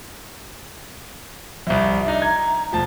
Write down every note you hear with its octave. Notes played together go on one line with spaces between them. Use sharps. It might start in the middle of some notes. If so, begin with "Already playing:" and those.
C2 F2 E5
D4 D#4
A#5 G#6
E1 F3 A3 A5